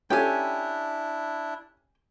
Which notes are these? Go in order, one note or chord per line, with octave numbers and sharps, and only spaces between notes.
C#4 D4 E4 G4 A4 G5 G#5